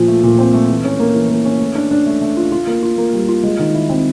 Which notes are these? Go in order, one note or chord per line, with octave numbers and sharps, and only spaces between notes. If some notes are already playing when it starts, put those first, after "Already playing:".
Already playing: A#2 F3
A3
A#2
C4
A3
E3
C#4
A#3
E3
A#3
C#4
A3
D4
D4
A3
A3
F4
F4
A#3
F4
A#3
G3
F4
G#3
D#3
E4
C4